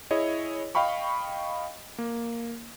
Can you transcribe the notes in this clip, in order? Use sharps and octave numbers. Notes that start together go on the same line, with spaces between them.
E4 G#4 C#5 D#5
D#5 F5 G5 B5 C#6
A#3